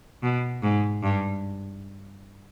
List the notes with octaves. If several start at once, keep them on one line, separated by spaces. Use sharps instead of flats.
B2
G#2
G2